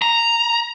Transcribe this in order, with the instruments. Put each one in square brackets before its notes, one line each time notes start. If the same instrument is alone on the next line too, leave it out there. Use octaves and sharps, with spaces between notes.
[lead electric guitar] A#5